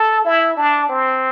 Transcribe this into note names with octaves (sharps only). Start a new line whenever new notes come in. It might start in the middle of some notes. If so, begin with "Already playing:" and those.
Already playing: A4
E4
D4
C4